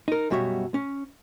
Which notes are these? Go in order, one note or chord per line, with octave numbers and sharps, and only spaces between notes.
D#4 A#4
F#2 B2 G3 F#4 C#5 E5
C#4